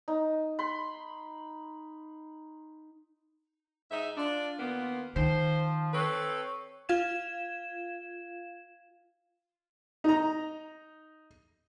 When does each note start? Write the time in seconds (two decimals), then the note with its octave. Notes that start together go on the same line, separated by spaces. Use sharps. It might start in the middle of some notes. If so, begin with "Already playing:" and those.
0.08 D#4
0.59 B5 C6
3.91 G#2 D#4 E5
4.17 D4 F4
4.59 D#2 A#3 B3
5.16 D#3 F3 C5
5.93 C4 A4 B4 C#5
6.89 F4 F5 G#6 E7
10.04 D#4 A#5